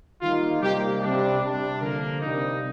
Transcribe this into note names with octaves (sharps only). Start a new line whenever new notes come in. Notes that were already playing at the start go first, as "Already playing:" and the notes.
D#3 G3 A#3 D#4 F4
C3 G3 A#3 D#4 G4
C3 G3 D4
C3 G3 D4
D3 F3 A#3 A#4
C3 G3 A#3 D#4